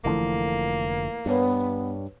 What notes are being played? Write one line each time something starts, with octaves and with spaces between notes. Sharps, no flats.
F1 D3 E3 F3 A3 A#3
G2 B3 B4 C#5